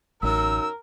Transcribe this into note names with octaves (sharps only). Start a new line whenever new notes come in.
A1 F#2 D#4 A#4 E6